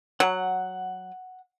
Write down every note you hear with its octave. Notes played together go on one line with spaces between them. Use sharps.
F#3 F#5